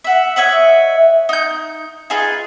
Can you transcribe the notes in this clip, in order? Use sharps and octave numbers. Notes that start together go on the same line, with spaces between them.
E5 F#5
C#5 D#5 E5 F#5
D#4 G6
D#4 F4 G#4 B4